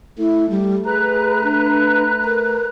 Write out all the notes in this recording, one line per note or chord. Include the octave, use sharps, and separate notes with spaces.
A3 E4
G3
G#4 B4 A#5 F#6
D4
A#4